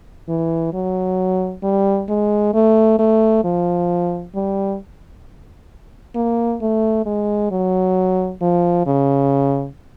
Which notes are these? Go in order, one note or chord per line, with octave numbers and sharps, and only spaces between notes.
E3
F#3
G3
G#3
A3
A3
F3
G3
A#3
A3
G#3
F#3
F3
C#3